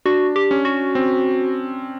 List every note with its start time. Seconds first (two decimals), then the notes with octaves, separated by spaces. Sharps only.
0.05 D4 F#4
0.36 G4
0.51 C#4
0.65 F#4
0.95 C4